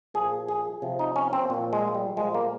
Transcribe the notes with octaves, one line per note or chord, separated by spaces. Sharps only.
A#2 F3 G#4
G#4
C3 F3
D#4
C#4
C4
A#2 F3
G#3
G3
A#2 F3 G#3
A#3